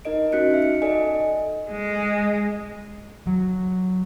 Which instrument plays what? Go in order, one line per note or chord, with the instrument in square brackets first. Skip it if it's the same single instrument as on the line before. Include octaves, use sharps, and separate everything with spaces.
[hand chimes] D#4 A#4 D#5 D7
C#4 F#4 F#6 C#7 D7
D#4 E5
C#7
A4 D5 D#5 G#5
[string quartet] G#3
[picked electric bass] F#3